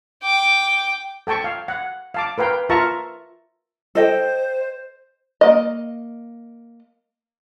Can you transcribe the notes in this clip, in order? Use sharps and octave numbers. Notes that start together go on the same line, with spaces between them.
G5 D6
A4 G5 A5 C#6
F5
F#5
F5 A5 D6
A#4 B4 F5 G5
F4 A#4 E5 A5 A#5 C#6
A4 C5 D#5 G5
A#3 D#5